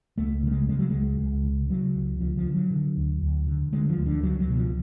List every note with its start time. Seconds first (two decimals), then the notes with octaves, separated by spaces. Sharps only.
0.18 C#2 A3
0.43 C#3 A3
0.51 G#3
0.69 C#3 G#3
0.79 F#3
0.90 C#2 G#3
1.19 C#2
1.44 C#3
1.69 C#3 F#3
1.95 C#2
2.20 D2 F3
2.37 F3
2.46 D3
2.54 F#3
2.71 D3
2.97 D2
3.22 D2
3.47 D3
3.72 D3 G#3
3.89 F3
3.97 D2
4.06 D3
4.23 C#2 F#3
4.40 F#3
4.48 B2
4.57 F3